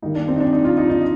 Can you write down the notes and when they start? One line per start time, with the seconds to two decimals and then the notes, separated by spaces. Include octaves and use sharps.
0.02 G2 D#3 A#3 D#4
0.15 D4
0.28 C4
0.36 D#4
0.40 D4
0.52 D#4
0.64 F4
0.77 D#4
0.89 D#4